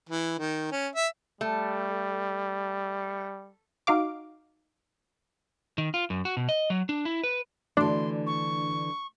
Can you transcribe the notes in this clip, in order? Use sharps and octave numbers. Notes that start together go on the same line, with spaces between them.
E3
D#3
C#4
E5
G3 A3
D#4 F#4 F5 D6
D#3
F4
F#2
F#4
B2
D#5
F#3
D4
E4
B4
D3 E3 A3 D4 F#4 C6
C#6